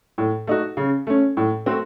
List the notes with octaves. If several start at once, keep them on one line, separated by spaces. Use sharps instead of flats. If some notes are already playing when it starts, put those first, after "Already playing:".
A2
A3 D#4 F#4
C#3
A3 C#4
A2
A3 C4 F#4